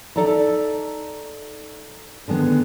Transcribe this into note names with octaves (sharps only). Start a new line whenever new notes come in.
D#4 A4 D5 E5 A#5
D3 D#3 G#3 B3 G#4